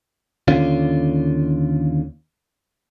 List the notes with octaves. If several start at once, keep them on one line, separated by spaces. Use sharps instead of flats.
D#2 D3 C#4 F4